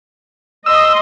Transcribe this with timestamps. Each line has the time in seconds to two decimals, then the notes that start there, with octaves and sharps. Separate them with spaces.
0.66 D#5 C6 E6